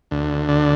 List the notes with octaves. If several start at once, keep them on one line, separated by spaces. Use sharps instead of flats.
D2
D3